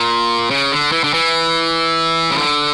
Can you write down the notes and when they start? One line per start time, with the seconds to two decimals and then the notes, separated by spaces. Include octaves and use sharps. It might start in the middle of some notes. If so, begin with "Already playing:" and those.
Already playing: A#2
0.50 C#3
0.72 D3
0.92 E3
1.04 D3
1.14 E3
2.32 C#3
2.37 D3